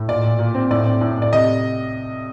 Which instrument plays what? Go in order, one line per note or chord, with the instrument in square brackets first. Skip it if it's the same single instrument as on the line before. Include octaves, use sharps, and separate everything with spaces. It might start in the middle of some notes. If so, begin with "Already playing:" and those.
Already playing: [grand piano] A2
A#2 D5
A#2
A#2
C4
A2 D5
C4
A2
A2 D5
C3 D#5